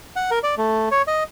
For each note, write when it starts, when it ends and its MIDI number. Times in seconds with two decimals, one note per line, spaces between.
0.16 0.30 78
0.31 0.39 70
0.43 0.55 74
0.58 0.89 57
0.91 1.02 73
1.07 1.24 75